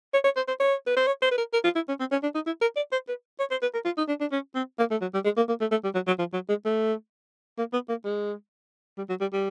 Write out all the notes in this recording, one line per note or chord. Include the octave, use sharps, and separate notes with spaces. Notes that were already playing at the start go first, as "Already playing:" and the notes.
C#5
C#5
C5
C5
C#5
B4
C5
C#5
C5
B4
A#4
A#4
F4
E4
C#4
C4
C#4
D4
D#4
E4
A#4
D5
C5
B4
C#5
C5
B4
A#4
F4
D#4
D4
D4
C#4
C4
A#3
A3
F#3
G3
G#3
A#3
A#3
A3
A3
G3
F#3
F#3
F3
F#3
G#3
A3
A#3
B3
A#3
G#3
G3
F#3
G3
G3